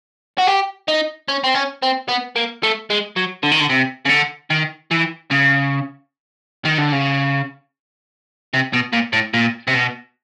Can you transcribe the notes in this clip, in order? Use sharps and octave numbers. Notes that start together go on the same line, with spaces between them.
F#4
G4
D#4
C#4
C4
C#4
C4
B3
A#3
A3
G#3
F#3
D3
D#3
D3
C3
C#3
D3
D#3
E3
C#3
D#3
D3
C#3
C3
B2
A#2
A2
A#2
C3
B2